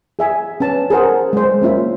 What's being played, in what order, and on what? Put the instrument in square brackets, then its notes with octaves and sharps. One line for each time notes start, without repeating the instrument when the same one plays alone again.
[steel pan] G#4 E5 G#5
C#4 B4 A5
G#4 A#4 C5 F#5
G#3 C5
A#3 C#4 F4 E5